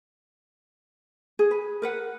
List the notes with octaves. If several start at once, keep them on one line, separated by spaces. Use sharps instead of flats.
G#4
B4
A#4 B4 F#5